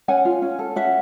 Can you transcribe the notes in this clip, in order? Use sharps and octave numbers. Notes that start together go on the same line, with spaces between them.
C#4 F#5 G#5
F4
C#4
A4
C#4 E5 F#5